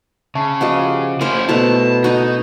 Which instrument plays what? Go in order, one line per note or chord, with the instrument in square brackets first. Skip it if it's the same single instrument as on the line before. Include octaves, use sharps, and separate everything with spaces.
[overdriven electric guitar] C#3 [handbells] E5 A5 C#6
[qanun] F3 F#4 D#5 [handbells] G4 F5 F#5
[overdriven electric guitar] C#4 E4 [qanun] A#4 C5
[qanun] B2 A3 A#5 [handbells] E4 B4 [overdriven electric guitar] A5
[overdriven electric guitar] D#4 [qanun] F#4 D#5